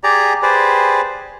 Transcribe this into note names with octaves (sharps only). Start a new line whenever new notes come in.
G4 G#4 D5 A#5
G4 G#4 B4 C5 D5